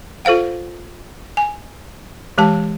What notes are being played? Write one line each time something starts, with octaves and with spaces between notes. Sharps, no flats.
F4 A4 C5 F5 F#5
G#5
E3 G#3 G4 A5